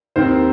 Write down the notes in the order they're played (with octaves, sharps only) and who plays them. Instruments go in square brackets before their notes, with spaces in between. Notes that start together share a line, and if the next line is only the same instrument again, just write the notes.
[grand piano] D#2 D#3 C4 C5